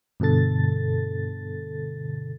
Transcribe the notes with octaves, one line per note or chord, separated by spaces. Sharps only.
G2 B2 D3 A4 A6